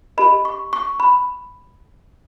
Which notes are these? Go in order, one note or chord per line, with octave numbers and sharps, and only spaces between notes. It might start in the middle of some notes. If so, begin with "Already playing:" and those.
G4 A#4 D#5 B5
C#6
C#6
B5